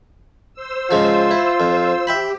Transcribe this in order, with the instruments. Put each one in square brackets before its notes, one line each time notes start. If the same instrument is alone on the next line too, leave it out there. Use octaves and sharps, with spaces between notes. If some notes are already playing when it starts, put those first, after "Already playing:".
[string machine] C5 E6
[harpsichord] G#2 C#3 F3 [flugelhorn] F4
[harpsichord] E4
F2
[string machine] G4 [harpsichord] E5 G5 B5